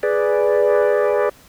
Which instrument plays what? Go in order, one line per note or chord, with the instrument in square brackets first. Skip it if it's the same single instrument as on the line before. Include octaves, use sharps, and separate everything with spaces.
[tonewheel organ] G#4 B4 D5